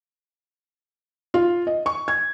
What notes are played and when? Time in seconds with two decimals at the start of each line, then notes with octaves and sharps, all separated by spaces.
1.34 F4
1.67 D#5
1.86 C#6
2.08 G#6